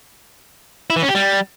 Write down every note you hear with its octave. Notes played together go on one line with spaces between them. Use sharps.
E4
E3
C#4
G4
G3